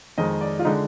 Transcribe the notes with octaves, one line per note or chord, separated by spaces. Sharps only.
F2 D#3 G#3 D#5
D5
F4
D3 G#3 D#4